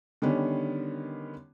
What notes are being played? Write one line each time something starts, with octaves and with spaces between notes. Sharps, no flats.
D3 D#3 G3 B3 C#4